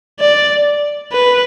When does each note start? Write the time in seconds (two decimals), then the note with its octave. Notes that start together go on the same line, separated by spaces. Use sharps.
0.20 D5
1.12 B4